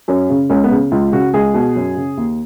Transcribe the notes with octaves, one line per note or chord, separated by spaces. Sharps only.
F#2 C#4
C#3
C#2 C#4
B3
C#3
C#2 F4
C#3 F#4
C#2 G#4
B2
F#2
C#3
D#2